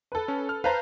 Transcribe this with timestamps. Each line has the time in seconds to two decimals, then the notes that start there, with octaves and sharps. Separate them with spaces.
0.12 A4 B4
0.28 C#4
0.49 F6
0.64 B4 C5 F5 A5 A#5